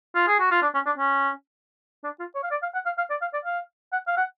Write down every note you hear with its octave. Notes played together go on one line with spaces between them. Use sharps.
F4
G#4
F#4
F4
D4
C#4
D4
C#4
D4
F4
C#5
F5
D5
F5
F#5
F5
F5
D5
F5
D5
F5
F#5
F5
F#5